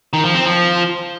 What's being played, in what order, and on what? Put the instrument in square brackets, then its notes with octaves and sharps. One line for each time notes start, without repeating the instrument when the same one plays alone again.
[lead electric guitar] D#3
F3
C4
F3